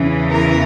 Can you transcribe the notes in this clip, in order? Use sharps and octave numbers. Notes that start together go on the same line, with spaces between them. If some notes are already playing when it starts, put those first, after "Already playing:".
Already playing: E2 C#3 E3
A#4